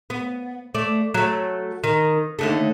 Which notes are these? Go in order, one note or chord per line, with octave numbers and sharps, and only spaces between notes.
B3
A3 D5
F#3 A3
D#3
D#2 D3 A3